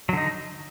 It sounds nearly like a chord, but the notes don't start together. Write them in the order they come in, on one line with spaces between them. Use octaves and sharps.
F#3 D3 D#4